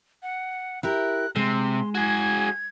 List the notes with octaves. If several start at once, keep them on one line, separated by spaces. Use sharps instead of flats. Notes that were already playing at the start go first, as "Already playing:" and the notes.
F#5
E4 G4 A#4 F#6
C3 G#3 C6
F#4 G#4 G#6